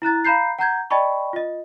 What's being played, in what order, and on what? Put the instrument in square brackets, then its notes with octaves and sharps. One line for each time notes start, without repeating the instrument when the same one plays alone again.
[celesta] E4 A#5 F#6 A6
F5 A#5 B5 G6 C7
F#5 A#5 G6 G#6
D5 D#5 G5 A5 B5 C#6
F4 D#5